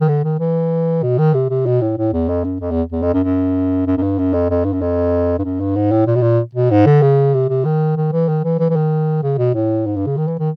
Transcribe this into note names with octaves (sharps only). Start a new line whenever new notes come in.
D#3
D3
D#3
E3
B2
D#3
C3
C3
B2
A2
A2
E2
F2
F#2
F2
E2
E2
F2
F#2
F#2
F#2
F#2
G2
F#2
F2
F2
G2
F#2
F2
G2
F#2
G2
G#2
A2
A#2
B2
A#2
B2
G#2
D3
C#3
C3
C3
D#3
D#3
E3
D#3
E3
E3
E3
D#3
C#3
B2
A2
G#2
G2
C#3
D#3
E3
D#3